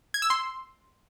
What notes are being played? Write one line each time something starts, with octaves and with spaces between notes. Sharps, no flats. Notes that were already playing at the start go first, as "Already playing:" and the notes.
G#6
E6
C6